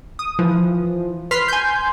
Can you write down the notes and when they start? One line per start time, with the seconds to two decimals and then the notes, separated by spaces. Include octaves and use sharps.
0.19 D#6
0.39 E3 F3
1.31 B4 C6 F6 B6 C7
1.48 G#5 C6 G6